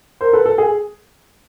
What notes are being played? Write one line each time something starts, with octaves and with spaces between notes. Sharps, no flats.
A#4 C5
A4 B4
A4
G#4